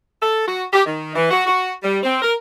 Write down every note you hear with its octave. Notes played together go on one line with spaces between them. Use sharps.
A4
F#4
G4
D#3
E3
F#4
F#4
G3
C4
A#4